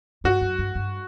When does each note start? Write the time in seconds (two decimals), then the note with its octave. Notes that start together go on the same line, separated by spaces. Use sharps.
0.24 G2 F#4
0.41 F#2
0.59 G2
0.75 G2